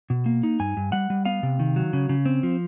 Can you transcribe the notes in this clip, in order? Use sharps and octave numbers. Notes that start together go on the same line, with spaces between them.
B2
A#3
D#4
G2 G#5
G2
G3 F#5
G3
B3 F5
C3
D#3
F#3
C#3
C#3
C4
F3